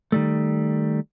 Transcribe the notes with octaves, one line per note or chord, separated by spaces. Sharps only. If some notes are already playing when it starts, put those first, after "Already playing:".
D#3 G3 A3